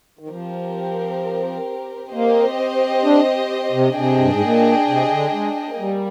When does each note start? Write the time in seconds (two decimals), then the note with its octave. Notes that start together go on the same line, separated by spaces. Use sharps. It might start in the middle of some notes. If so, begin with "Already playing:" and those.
0.19 D#3
0.29 F3 C4 G4 A#4
2.12 A#3 C4 G4 C5 D#5
3.04 D4
3.72 C3
3.95 C3 D4 G#4 D#5 G5
4.18 G2
4.30 G#2
4.42 A#2
4.88 C3
5.10 D3
5.33 G#3
5.79 G3 A#3